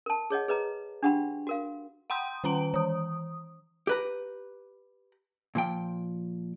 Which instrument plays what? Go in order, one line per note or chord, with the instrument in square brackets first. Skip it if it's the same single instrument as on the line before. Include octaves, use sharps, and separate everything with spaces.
[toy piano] A#4 A5
G#4 C#5 D#5 F#5
G#4 B4 D#5 A#5
D4 F#4 G4 F#5 G5 B5
F#4 A#4 F5
[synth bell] F#5 G5 C6 D#6 G6
D#3 C#4 A#5 D7
E3 D#6
[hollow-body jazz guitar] G4 B4 A#5
A#2 F3 G5